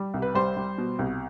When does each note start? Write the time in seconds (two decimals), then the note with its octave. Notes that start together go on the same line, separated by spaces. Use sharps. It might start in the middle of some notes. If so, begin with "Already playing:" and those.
Already playing: G3
0.14 C2
0.22 B4
0.35 G3 C5
0.57 G3
0.78 B2
0.99 C2